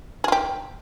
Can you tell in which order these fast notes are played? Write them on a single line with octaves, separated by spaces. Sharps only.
G#4 F4 G4